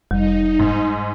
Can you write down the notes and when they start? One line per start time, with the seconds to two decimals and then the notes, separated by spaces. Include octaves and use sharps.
0.11 F1 G3 D#4
0.59 G#2